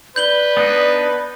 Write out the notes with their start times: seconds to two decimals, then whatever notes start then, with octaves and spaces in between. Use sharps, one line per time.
0.16 B4 D5 G6 F#7 G7
0.57 B3 D4 D#4